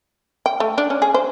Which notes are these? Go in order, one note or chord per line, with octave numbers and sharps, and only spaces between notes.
G5
A3
D4
C#4
G#4
C5